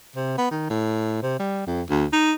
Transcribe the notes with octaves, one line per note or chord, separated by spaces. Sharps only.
C3
B3
D#3
A2
C3
G3
F2
D2
D#4